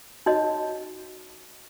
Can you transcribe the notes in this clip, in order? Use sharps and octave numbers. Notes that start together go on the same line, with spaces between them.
D#4 F#4 C#5 D#5